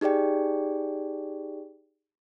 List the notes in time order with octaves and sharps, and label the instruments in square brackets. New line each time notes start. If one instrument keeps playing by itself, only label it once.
[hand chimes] D#4 G4 G#4 D5 G5